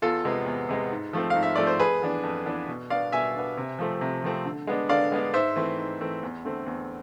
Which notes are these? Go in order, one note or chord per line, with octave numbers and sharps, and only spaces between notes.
E2 F4 A4
C3 G#3 B3
E2
C3 G#3 B3
G#2
F3 A3 C4
G#2 F5
E5
F3 A3 C4 D5
C5
F2 G#4 B4
E3 B3 D4
F2
E3 B3 D4
B2
B3 D4 D5 F5
B2 E5 G#5
B3 D4
C3
F3 A3 C4
C3
F3 A3 C4
D3
G#3 B3 D4
D3 D5 F5
G#3 B3 D4
G#2 C5 E5
E3 A3 C4
G#2
E3 A3 C4
E2
D3 A3 C4
E2